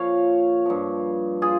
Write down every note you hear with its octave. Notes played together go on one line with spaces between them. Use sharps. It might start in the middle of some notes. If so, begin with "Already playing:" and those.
Already playing: A#2 F3 C#5 F5
G2 F3
F4 G#4